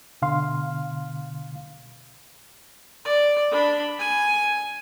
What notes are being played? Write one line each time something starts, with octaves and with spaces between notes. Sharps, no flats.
B2 D3 F5 C6
D5
D4 B5
G#5